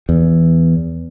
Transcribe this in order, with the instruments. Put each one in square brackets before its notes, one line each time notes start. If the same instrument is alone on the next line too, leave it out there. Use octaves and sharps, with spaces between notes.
[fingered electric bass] E2